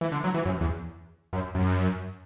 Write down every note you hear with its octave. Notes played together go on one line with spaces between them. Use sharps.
E3
D3
F#3
E3
F#2
E2
F#2
F#2